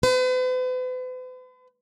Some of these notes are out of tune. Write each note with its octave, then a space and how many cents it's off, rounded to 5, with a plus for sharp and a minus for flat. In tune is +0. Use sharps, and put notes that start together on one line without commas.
B4 +45